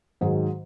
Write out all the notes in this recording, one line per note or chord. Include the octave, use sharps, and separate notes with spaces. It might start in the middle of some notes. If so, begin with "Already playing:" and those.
G#2 D#3 F#3 G#4